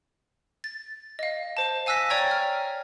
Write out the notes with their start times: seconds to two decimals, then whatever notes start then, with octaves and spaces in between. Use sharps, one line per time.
0.64 A6
1.19 D#5 F5
1.57 C5 A5
1.86 F5 G#5 E6 F#6 A#6 B6
2.10 C#5 D5 G5 A#5 C#6 G#6
2.31 F6